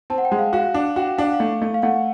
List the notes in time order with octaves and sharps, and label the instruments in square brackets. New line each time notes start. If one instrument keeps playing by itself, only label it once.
[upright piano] C4 [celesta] A5
[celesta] F#5
G5
[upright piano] G#3
[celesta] F5
[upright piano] F#4 [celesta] F5
[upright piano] D4
[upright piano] F#4 [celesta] G5
[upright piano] D4 [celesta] F5
[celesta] F#5
F5
[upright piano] A3
A3
[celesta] F5
[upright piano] A3 [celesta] F#5